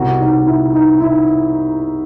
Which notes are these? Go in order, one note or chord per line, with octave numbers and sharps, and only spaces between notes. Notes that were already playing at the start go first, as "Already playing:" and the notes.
Already playing: C2 B2 F#4
D#4
E4
D#4
E4